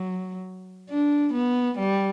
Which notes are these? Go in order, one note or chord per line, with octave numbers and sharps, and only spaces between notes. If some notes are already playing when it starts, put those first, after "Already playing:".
Already playing: F#3
D4
B3
G3